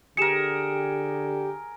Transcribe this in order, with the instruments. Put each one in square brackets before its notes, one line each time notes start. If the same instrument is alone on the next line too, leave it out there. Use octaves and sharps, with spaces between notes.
[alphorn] D3 [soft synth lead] G4 [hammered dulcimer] G#4 A#4 [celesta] C#7 E7